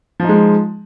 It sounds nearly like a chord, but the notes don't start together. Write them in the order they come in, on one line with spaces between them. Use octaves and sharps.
F3 D#4 G#3